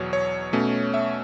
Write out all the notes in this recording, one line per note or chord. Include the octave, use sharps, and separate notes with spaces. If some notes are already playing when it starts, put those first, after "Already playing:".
Already playing: E2 B2 F#3 C#5
C#5
B2 A3 C#4
E5